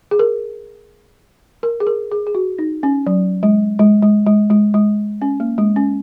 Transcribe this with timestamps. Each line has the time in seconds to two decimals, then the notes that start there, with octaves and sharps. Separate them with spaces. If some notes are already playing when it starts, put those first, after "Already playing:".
0.11 G#4
0.19 A#4
1.63 A#4
1.80 G#4
1.87 A#4
2.12 G#4
2.27 G#4
2.35 F#4
2.59 D#4
2.83 C#4
3.07 F#3
3.43 G#3
3.79 G#3
4.02 G#3
4.26 G#3
4.50 G#3
4.74 G#3
5.22 C#4
5.40 A#3
5.58 G#3
5.76 C#4